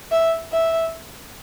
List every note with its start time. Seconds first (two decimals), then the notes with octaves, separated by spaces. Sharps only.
0.11 E5
0.52 E5